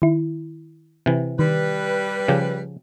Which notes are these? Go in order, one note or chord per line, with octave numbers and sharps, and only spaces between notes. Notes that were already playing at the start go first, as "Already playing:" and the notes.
D#3 E4
C3 E3
D#3 G3 B4
C#3 F3 G4